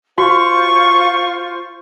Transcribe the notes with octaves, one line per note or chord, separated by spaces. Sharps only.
F4 F#4 C5 C#6